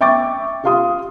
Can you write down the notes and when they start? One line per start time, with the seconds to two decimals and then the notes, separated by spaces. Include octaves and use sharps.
0.01 E5 G5 C#6 D6 A6
0.64 F4 G4 F5 C6 D#6